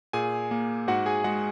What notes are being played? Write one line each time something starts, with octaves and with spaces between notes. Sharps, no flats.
A#2 G#4 G#5
A#3
G#2 F#4 F#5
G#4 G#5
G#3 F#4 F#5